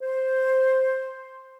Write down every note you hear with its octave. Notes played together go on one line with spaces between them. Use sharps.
C5